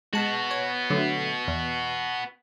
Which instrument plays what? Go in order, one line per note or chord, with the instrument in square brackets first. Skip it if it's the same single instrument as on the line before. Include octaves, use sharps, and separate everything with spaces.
[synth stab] G#3 A5 [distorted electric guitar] B3 F#4
[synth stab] C#5
D3 F#3 A3
E2